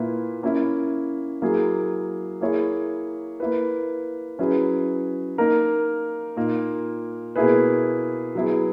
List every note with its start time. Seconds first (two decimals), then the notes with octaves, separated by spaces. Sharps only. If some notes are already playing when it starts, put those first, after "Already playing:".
Already playing: A#2 A#3 E4 B4
0.43 A#3 C#4 E4
1.42 F#3 A#3 E4 G#4
2.41 A#3 E4 G#4 C#5
3.40 A#3 E4 B4
4.39 F#3 C#4 E4 G#4 B4
5.38 A#3 D#4 A#4
6.37 A#2 A#3 D#4
7.36 B2 A#3 E4 G#4 B4
8.35 F#3 B3 E4 G#4